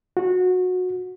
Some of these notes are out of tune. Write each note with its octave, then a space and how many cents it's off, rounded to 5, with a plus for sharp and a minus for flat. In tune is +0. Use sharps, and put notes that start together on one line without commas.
F#4 -20